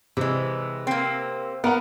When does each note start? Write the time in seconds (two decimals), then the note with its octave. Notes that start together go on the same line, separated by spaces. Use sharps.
0.17 C3 E3 G#3
0.87 A#3 C4
1.64 B3 A#4 F#5